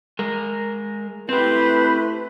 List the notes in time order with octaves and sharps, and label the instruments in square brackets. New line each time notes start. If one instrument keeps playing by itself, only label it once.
[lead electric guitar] G#3 A#4
[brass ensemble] A3 E4 [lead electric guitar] C4 G4 [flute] B4 [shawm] C5